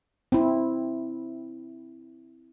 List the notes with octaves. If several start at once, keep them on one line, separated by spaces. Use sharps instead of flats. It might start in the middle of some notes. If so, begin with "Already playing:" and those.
C4 E4